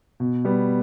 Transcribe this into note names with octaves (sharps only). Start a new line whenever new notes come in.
B2
G3 B3